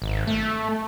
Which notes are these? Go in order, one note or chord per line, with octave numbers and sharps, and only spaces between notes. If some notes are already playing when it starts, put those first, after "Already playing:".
G#1
A3